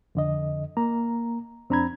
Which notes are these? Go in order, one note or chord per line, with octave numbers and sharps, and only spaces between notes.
F2 D3 D#5
A#3 A#5
F2 C4 D4 A#5 B5 G#6